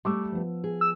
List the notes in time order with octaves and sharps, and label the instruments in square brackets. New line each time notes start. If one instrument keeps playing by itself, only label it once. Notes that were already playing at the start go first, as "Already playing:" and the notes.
[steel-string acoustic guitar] G3 A3 [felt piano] C#6 D6 E6
[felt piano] F3 B3
[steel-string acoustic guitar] G#4
[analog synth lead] E6